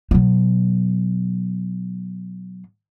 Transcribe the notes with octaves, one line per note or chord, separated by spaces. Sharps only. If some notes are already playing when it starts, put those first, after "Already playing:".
B2 F#3